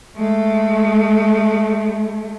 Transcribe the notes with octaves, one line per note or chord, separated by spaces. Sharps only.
G#3 A3